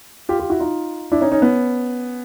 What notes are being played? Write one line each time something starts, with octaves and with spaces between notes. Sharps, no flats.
F4 G4
F4 G4
E4 F#4
D#4 F4
D4 E4
C#4 D#4
C#4 D#4
B3 C#4